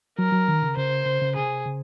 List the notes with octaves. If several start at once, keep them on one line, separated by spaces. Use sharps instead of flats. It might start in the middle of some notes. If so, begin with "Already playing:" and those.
F#3 A#4
F#3
D#3
C#3
C#3 C5
C#3
C#3
C3 G#4
C#3